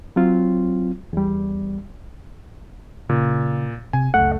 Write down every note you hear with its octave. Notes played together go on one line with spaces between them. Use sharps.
F#3 C4 F4
E2 G3
A#2 C#3
C3 G#5
F#1 C#2 A3 F#5